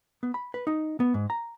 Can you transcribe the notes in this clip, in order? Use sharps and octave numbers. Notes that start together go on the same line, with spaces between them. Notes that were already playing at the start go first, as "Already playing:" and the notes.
B3
B5
B4
D#4
B3
G#2
A#5